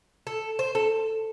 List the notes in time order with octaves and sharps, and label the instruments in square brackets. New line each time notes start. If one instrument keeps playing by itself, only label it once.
[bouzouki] A4
C5
A4